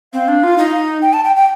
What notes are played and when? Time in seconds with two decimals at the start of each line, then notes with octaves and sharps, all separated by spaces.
0.13 C4 F5
0.28 D4
0.44 F4
0.58 D#4
1.02 G5
1.13 A5
1.24 G5
1.36 G5